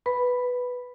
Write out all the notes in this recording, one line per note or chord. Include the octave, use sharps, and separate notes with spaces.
B4 B5